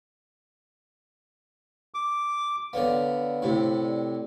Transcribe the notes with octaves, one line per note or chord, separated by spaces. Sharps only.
D6
D3 B3 C#5 D5 F5
A2 C3
G4 D5